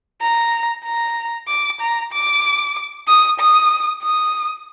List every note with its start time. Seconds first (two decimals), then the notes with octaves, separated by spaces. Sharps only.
0.21 A#5
0.85 A#5
1.48 D6
1.81 A#5
2.13 D6
3.08 D#6
3.39 D#6
4.03 D#6